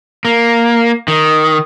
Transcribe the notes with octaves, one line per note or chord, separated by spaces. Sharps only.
A#3
D#3